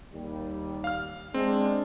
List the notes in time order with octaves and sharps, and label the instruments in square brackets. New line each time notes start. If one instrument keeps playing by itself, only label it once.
[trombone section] D#2 G3
[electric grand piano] F5 F6
[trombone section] G#3 D4 [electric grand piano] C4